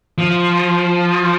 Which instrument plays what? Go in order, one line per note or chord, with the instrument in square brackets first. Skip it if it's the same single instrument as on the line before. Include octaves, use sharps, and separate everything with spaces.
[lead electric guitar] F3